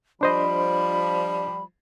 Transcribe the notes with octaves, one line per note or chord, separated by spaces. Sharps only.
F3 G3 D4 C5 D#5 B5